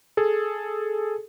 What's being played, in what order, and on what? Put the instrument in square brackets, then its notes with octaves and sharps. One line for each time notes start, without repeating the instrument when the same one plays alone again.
[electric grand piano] G#4 A4